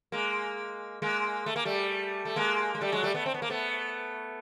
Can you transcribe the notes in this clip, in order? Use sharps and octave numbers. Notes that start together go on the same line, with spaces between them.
G#3 A#3
G#3 A#3
A3
A#3
G3 A3
A3
G#3 A#3
G#3
G3 A3
F#3 G#3
G3 A3
A3 B3
C4
B3
A#3
A3 B3